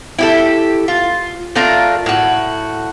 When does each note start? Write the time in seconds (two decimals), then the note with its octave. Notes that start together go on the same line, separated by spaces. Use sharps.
0.19 E4 G4 A4
0.88 F4
1.55 A3 D4 F4 A#4
2.06 A2 F#4